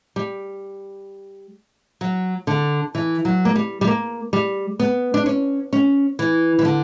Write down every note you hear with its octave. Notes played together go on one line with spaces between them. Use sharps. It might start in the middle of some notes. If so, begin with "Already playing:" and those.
G3
F#3
D3
E3
F#3
A#3
G3
G3
A#3
G3
B3
D4
C#4
C#4
E3
E3
D3